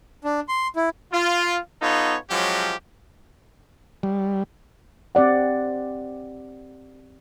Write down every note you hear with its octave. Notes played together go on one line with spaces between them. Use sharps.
D4
C6
E4
F4
B3 D#4 F4 A4 C#5
F3 F#3 G#3 C#4 G4
G3
C4 G4 D5 F#5